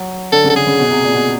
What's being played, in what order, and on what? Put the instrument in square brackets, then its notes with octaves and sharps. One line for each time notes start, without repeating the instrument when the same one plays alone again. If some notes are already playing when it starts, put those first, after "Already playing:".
Already playing: [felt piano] F#3
[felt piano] D3 [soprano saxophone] A4
[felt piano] C#3
[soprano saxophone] A4
[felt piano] D3 [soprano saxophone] G#4
[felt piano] C#3
B2
C3
A#2
B2